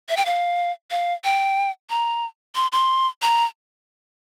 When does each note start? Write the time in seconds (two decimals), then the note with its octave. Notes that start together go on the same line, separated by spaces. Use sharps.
0.09 E5
0.17 G5
0.26 F5
0.91 F5
1.24 G5
1.90 A#5
2.55 C6
2.72 C6
3.22 A#5